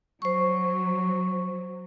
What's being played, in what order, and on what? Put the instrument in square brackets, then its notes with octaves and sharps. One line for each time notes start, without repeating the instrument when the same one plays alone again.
[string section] F#3 [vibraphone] C5 C#6